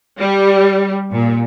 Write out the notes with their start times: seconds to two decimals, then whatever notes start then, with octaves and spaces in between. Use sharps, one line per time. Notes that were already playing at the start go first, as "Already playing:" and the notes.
0.20 G3
1.12 A#2